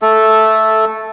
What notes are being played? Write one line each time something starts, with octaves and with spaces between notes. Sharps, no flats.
A3 A4